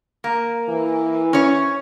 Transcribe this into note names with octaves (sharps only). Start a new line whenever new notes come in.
A#3
E3
C#4 C#5